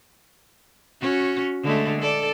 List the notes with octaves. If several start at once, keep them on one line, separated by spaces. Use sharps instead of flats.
C#4 F#4
D3 G#3 A3
A4 D5